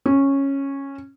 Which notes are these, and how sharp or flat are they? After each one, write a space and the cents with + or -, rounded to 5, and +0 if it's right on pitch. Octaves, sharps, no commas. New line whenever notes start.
C#4 -10